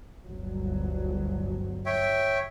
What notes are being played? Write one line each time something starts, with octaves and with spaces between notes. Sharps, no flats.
G1 D2 F#3
C#5 E5 G5